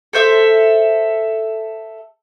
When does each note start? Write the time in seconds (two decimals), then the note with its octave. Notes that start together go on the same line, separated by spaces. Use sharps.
0.13 A4 C5 E5